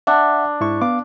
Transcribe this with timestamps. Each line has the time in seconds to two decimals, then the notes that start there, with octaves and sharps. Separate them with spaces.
0.07 D4 E5 F#5
0.61 G#2 E4 C#6
0.81 B3 F5 D6